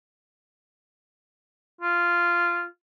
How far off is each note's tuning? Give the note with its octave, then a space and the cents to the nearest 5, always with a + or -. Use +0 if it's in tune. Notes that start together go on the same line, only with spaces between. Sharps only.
F4 -10